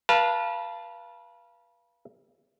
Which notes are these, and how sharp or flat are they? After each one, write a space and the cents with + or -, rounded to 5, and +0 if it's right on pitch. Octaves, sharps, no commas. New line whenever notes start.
B4 -35 F5 -20 A5 +0